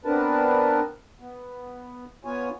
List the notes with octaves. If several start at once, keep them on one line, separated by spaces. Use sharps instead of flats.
B3 C4 D4 A#4 B4 A5
B3
B3 F4 C#5 G#5